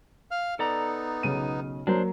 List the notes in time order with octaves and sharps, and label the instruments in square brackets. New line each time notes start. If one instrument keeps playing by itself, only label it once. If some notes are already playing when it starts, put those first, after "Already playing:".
[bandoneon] F5 F6
[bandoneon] B3 D#4 [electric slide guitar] A4 D5 A#5
[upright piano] B1 C#3 D#7
[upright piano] F#3 A#3 [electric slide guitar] D4 C5